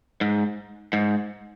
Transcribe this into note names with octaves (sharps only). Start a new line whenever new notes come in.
G#2
G#2